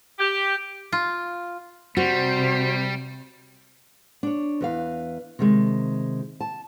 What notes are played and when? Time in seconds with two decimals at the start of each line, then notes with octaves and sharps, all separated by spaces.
0.19 G4
0.92 F4
1.97 C3 G3 F#4 C5
4.23 D4 C#5
4.61 E2 B4 F5
5.39 C3 D#3 G#3
6.41 A5